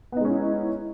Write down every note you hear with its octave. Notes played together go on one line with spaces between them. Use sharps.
G#3 B3 C#4 D#4 E4